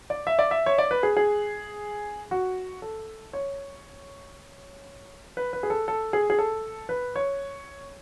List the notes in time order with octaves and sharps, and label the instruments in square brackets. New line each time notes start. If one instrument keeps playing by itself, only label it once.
[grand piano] D5
E5
D5
E5
C#5
D5
B4
G#4
G#4
F#4
A4
C#5
B4
B4
G#4
A4
A4
G#4
G#4
A4
B4
C#5